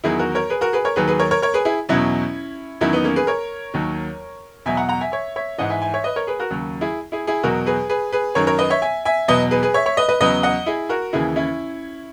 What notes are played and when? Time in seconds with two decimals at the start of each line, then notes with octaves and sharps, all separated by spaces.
0.04 E2 D#3 F#3 E4 G#4
0.19 F#4 A#4
0.35 A#4 C#5
0.50 G#4 B4
0.61 F#4 A#4
0.73 G#4 B4
0.85 A#4 C#5
0.96 D#2 D#3 F#3 G#4 B4
1.08 G#4 B4
1.19 A#4 C#5
1.31 A#4 C#5
1.42 A#4 C#5
1.54 G#4 B4
1.65 E4 G#4
1.89 E2 B2 F#3 C#4 E4
2.81 E2 D#3 F#3 C#4 E4
2.93 B3 D#4
3.04 A#3 C#4
3.16 G#4 B4
3.27 A#4 C#5
3.74 D#2 D#3 F#3
4.66 E2 B2 F#3 E5 G#5
4.77 F#5 A#5
4.89 F#5 A#5
5.01 E5 G#5
5.12 C#5 E5
5.36 C#5 E5
5.58 G#2 E3 D#5 F#5
5.70 E5 G#5
5.82 E5 G#5
5.94 C#5 E5
6.04 B4 D#5
6.16 A#4 C#5
6.27 G#4 B4
6.40 F#4 A#4
6.51 D#2 C#3 F#3
6.81 E4 G#4
7.12 E4 G#4
7.27 E4 G#4
7.43 E2 B2 F#3 F#4 A#4
7.66 G#4 B4
7.90 G#4 B4
8.13 G#4 B4
8.35 F#2 D#3 F#3 A#4 C#5
8.47 A#4 C#5
8.59 B4 D#5
8.70 C#5 E5
8.82 E5 G#5
9.05 E5 G#5
9.28 E2 B2 F#3 B4 D#5
9.51 G#4 B4
9.63 G#4 B4
9.74 C#5 E5
9.86 C#5 E5
9.97 B4 D#5
10.09 B4 D#5
10.21 E2 C#3 F#3 B4 D#5
10.43 D#5 F#5
10.66 E4 G#4
10.89 F#4 A#4
11.13 D#2 C#3 E3 E4 G#4
11.36 C#4 E4